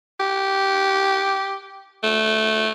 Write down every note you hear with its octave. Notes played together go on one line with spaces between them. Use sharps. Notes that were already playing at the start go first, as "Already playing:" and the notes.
G4
A3